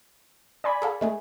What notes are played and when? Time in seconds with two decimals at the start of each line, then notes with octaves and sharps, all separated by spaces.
0.64 D5 G#5 B5
0.82 G#4 A4 F5
1.01 G#3 A3 G#4